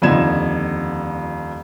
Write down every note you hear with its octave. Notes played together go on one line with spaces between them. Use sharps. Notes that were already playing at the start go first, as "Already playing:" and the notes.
D#1 F2 D3 D#4 G#6 E7